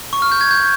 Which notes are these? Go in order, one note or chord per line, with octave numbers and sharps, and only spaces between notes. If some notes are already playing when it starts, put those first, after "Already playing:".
C#6
F6
G6
G#6
G6